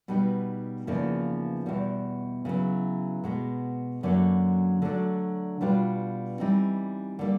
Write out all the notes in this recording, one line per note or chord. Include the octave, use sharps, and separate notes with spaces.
B2 G3 B3 D#4
E2 C#3 F3 A#3 D#4
E2 B2 G3
C#3 F#3 B3 E4
B2 G#3 B3
F#2 D3 F#3 A#3 C#4
D3 F#3 A3 D4
B2 G3 B3 D4 F4
E3 G3 C4 D#4
D3 G3 A#3